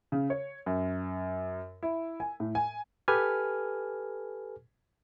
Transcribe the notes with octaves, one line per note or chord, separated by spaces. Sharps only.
C#3
C#5
F#2
E4
G#5
A2
G#5
G4 A4 B4 G#5 F6